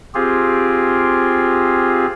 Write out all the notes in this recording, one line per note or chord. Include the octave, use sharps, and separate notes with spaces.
C4 F4 G4 G#4